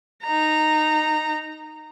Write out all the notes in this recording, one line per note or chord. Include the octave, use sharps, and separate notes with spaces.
D#4 A#5